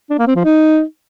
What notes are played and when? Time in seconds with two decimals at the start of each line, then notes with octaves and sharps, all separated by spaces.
0.10 D4
0.19 A#3
0.27 C4
0.36 F3
0.44 D#4